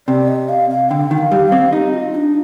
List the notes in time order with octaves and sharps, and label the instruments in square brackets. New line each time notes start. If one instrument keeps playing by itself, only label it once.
[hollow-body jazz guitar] C3 [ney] D5
[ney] D#5
F5
F5
[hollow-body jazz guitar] D3 [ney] G5
[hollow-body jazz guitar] D#3
[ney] F5
[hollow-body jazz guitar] G3
[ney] F5
[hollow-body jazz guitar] C4
[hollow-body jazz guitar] D#4 [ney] G4
[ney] F4
D4